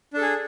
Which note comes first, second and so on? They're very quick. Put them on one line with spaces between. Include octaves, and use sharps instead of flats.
D4 A4 G#4